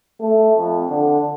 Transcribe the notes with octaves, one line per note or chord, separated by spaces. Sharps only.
A3
F2
D3